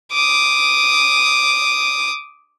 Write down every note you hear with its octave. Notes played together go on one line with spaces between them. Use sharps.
D6 D#6